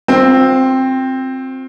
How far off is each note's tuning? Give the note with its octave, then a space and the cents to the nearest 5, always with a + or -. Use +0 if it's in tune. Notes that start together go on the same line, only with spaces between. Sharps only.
C4 +5 F4 +35 C5 +0